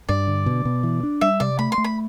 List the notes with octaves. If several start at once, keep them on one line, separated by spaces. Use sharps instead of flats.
G2 D5
D3
B2
B2
E3
D4
G3 E5
C3 D5
A3 B5
C6
A3
B5